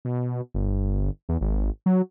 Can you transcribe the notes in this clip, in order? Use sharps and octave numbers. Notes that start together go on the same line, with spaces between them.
B2
G1
E2
G#1
F#3